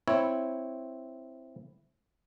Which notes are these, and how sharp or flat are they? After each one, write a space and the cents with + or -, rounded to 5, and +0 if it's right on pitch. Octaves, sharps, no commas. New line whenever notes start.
C4 +0 E4 +0 C#5 -5